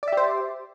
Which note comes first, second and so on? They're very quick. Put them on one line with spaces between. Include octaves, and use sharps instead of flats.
D5 E5 G4 C5